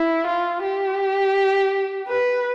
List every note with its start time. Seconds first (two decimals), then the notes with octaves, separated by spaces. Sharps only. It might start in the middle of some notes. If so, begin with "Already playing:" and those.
Already playing: E4
0.27 F4
0.63 G4
2.07 B4